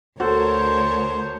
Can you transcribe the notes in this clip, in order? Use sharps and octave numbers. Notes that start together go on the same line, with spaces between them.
D2 F#4 A4 A#4 C5 C#5 A5